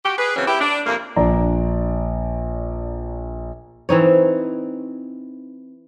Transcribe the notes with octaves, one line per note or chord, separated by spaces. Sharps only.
F#4 G4
G#4 B4
C#3 E3 F#3 C4 C#4
E4 G4
D4
F2 C3 A#3
A#1 D4 D5 A#5
E3 C4 D#4 C#5